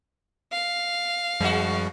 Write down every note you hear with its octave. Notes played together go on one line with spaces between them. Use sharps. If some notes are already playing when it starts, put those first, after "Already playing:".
F5
F#2 F3 G3 G#3 F#4